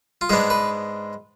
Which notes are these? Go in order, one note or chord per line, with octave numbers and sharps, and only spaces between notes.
F4
G#2 G#3 B3 D4 G#4
B4